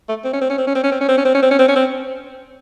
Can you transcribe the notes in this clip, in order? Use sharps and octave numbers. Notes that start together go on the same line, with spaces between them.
A3
C4
C#4
C4
C#4
C4
C#4
C4
C#4
C4
C#4
C4
C#4
C4
C#4
C4
C#4
C4
C#4
C4